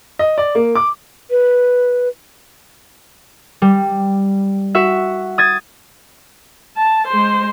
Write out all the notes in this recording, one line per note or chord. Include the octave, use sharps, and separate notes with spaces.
D#5
D5
A#3
D6
B4
G3
F#4 E5
D#6 G#6 A6
A5
G#3 C5